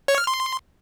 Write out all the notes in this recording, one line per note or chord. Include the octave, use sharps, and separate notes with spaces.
C#5
F6
C6